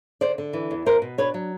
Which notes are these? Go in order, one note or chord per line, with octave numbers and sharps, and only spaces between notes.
D3 C5 D5
D3
E3
E2
B3 A#4 C5
B2
D4 B4 C#5
F#3